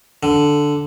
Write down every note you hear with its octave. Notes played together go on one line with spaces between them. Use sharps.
D3